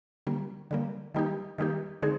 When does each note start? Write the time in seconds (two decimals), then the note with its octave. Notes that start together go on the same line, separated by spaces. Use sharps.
0.27 D3 G3 A#3
0.71 D3 G3 A#3
1.15 D#3 G3 A#3 D#4 G4
1.58 D#3 G3 A#3 D#4 G4
2.02 D3 G#3 C4 D#4 G#4